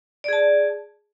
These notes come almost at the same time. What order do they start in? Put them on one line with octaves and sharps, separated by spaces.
D5 G#4 A5